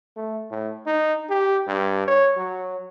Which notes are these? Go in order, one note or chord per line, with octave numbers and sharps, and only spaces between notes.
A3
A2
D#4
G4
G2
C#5
F#3